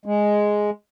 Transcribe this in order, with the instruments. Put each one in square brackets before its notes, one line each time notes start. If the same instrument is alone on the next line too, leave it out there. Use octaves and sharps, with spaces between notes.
[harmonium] G#3